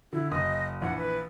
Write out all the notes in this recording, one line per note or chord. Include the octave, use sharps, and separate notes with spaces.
D3 E4
F#1 D#5 D#6
A#1 E3 F#5
B4